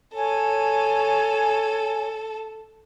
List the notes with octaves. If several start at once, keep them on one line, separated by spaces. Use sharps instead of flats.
A4 C#5 G#5